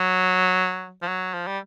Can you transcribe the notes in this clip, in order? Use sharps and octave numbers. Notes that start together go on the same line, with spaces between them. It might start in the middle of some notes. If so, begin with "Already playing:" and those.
Already playing: F#3
F3
F#3
F3
G3